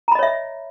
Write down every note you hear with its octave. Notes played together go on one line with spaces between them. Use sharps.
C#5 D#5 E5 A#5 B5